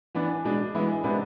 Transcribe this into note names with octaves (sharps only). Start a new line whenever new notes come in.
E3 B3 D4
B2 G#3 D4
E3 G#3 B3 E4
C3 G#3 B3 D4